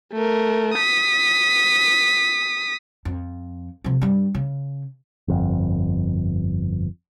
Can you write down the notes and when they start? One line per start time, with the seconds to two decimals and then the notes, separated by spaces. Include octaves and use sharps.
0.13 A3 A#4
0.74 D#6 B6
3.05 F2
3.84 C3 F3
4.02 G2 G3
4.35 C#3
5.28 G1 F2